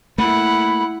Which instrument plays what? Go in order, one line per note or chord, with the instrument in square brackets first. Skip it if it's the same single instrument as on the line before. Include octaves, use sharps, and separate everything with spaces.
[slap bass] A3 A#3 [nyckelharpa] E4 F#5 [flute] B5